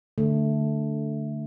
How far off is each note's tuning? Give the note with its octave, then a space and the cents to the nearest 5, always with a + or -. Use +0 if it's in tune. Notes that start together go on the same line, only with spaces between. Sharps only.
D3 +0 A3 +0